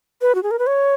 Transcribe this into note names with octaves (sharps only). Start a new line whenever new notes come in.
B4
F#4
G#4
A#4
B4
C#5